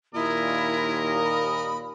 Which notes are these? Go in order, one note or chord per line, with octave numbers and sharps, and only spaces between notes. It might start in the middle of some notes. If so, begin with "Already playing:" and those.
D#2 A#2 E4 A#4 D#5
B5